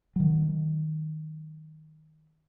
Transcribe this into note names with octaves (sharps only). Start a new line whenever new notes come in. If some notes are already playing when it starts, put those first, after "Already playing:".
D#3 F#3